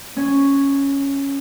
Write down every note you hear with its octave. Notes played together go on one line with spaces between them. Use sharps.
C#4